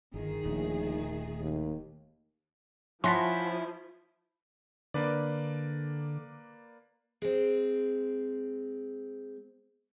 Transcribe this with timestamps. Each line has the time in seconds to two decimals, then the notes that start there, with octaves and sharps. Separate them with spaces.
0.14 G1 D#3 G#4
0.44 D#1 A#1 A3
1.40 D#2
3.04 F3 C#4 E4 F#5 A5 C6 A#6 B6
4.94 D3 A#3 B4 D5
7.22 G#3 C4